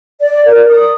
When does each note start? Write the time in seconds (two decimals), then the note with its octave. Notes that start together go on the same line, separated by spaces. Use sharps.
0.21 D5
0.45 A#4
0.70 D#6